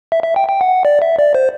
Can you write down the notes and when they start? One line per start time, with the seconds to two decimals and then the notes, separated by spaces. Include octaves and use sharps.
0.12 E5
0.23 E5
0.36 G5
0.49 G5
0.61 F#5
0.85 D5
1.02 E5
1.19 D5
1.34 C5